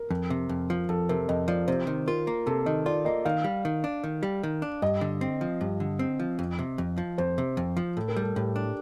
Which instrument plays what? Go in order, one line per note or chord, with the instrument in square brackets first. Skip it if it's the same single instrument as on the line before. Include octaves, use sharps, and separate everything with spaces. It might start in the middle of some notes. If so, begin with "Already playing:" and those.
Already playing: [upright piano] A#4
[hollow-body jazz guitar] F2
C3
F2
F3
[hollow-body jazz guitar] F2 [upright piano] A4
[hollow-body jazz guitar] C3 [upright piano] A#4
[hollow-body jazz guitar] F2 [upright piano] D#5
[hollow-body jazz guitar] F3 [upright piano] D5
[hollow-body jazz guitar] C3 [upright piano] C5
[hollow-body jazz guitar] D#3
[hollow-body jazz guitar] F4 [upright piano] A#4
[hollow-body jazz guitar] A#3
[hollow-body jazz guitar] C3 [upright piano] A4
[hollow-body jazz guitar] D#3 [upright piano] D#5
[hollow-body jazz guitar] F4 [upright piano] D5
[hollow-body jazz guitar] A#3 [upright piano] D#5
[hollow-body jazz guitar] D#3 [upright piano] F5
[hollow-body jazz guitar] G3
D#3
D4
D#3
G3
D#3
D4
[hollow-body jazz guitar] G2 [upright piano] D#5
[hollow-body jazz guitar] D3
C4
F3
G2
D3
C4
F3
F2
C3
F2
F3
[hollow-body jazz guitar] F2 [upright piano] C5
[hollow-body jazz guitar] C3
F2
F3
[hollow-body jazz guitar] A2 [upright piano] A4
[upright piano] A#4
[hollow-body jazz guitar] G3 [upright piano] A4
[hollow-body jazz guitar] A2 [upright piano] G4
[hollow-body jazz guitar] D4